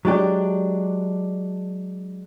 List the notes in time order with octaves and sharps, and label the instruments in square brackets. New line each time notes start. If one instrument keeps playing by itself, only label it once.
[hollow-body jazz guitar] F#3 G#3 D4 G4